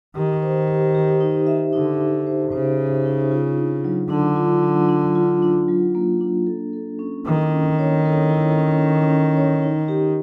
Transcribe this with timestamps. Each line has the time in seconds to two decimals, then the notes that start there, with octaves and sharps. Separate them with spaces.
0.16 D#3 G4
0.42 C5
0.68 G4
0.95 G4
1.20 D#4
1.47 E5
1.73 D3 D#4
2.00 D#4
2.27 C5
2.52 C#3 C5
2.79 D#4
3.05 D#4
3.31 F4
3.58 D4
3.85 F#3
4.10 D3 D4
4.36 F4
4.63 F#3
4.89 D4
5.15 F4
5.42 D4
5.68 F#3
5.95 A#3
6.21 D4
6.47 A4
6.73 A4
6.99 C#4
7.26 D#3 E4
7.52 C#4
7.79 C#5
8.05 A4
8.31 E4
8.58 C#4
8.84 C#4
9.09 C#4
9.37 C#5
9.62 D#4
9.88 G4